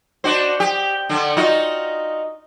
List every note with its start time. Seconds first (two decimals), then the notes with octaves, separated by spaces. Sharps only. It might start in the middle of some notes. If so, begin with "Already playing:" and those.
0.24 D4 F#4 C5
0.60 G4
1.09 D3 D4
1.37 D#4 F4 F#4